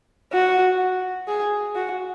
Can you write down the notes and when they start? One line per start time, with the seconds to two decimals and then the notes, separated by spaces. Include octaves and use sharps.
0.32 F#4
1.28 G#4
1.75 F#4